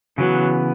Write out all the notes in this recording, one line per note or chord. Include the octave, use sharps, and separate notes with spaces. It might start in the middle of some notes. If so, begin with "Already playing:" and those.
C#3 E3 F#3 B3